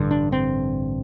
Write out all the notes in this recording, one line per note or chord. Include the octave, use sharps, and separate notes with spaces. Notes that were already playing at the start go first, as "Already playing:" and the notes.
Already playing: A1 G2 D3
D4
C4